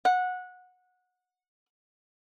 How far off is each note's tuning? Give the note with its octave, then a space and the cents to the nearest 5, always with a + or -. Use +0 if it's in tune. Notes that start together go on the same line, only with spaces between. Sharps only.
F#5 -20